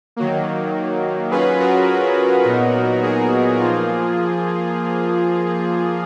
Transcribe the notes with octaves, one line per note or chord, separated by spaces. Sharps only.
D#3 F#3 A#3
F#3 C#4 F4 G#4 B4
F#4 A#4
A#2 F#3 B3 D#4
G#4
F3 A#3 F4